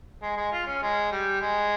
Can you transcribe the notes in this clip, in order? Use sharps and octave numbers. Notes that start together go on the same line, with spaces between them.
G#3
G#3
F4
C#4
G#3
G3
G#3